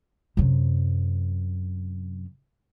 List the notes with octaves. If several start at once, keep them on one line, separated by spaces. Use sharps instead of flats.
F#2 C3